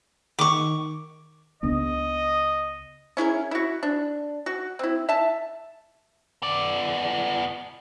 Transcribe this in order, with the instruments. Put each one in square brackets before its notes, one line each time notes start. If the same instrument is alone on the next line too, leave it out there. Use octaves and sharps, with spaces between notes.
[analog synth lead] D#3 [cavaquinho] C#6 D6
[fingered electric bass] C#2 B3 D4 [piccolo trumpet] D#5
[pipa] C#4 E4 G#4 A#4
E4 F#4
D4
F#4
C4 E4
E5 A5
[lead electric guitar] B3 D5